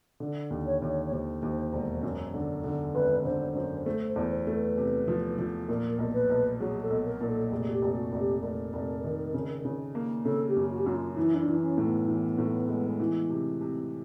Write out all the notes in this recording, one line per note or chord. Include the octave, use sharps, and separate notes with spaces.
D3
D#2
C#5
D#2
C#5
C#5
D#2 C5
D#2
E1
F#2
D3
D3
G#1 B4
D3 C5
F#2 C5
A3 C5
C5
E2
C5
A3
B4
C3
F3
F3
A#2 A#4
B1
B4
B1
F#3 G#4
A4
B1
A#4
A#2
A4
F1 G#4
F#4
G4
F1
F#4
F1 F#4
G4
F1 A#4
F1
D#3
C#3
C#3
A#3
C#3 A4
G4
F#2
F#4
G4
F#2 F#4
F4
E3 E4
C#4
D4
E3
C#4
A2
B3
E3
A2
G#3
E3
C3
C3